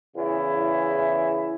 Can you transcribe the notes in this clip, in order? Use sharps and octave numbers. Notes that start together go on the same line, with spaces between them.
E2 C#3 E4